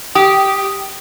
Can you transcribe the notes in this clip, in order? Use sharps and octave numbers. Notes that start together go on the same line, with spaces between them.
G4 D#6